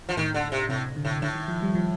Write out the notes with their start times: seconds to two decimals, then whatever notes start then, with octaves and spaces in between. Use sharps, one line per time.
0.09 F3
0.17 A2 D#3
0.34 D3
0.52 C3
0.69 A2 C3
0.96 D3
1.05 A2
1.22 A2 D3
1.35 D#3
1.48 F3
1.62 G3
1.75 F3